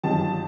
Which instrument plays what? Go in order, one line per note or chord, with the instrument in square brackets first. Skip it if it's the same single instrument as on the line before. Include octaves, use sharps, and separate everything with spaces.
[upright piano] G1 F#2 D#3 G3 A5